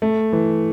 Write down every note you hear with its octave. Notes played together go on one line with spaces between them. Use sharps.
A3
E3